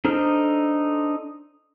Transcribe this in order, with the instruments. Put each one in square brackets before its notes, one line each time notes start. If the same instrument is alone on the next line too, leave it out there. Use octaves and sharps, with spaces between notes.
[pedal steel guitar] D4 D#4 A4 C5 F6